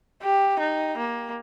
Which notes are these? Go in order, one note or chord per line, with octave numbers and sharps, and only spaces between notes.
G4
D#4
A#3